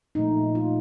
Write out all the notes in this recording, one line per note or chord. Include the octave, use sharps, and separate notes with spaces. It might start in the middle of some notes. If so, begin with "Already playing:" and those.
A#2 F3 A3 D#4
F4